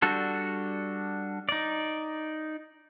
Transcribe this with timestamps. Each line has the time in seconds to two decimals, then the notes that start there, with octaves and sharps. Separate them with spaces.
0.02 G3 D4 F#4 A4
1.49 D#4 D5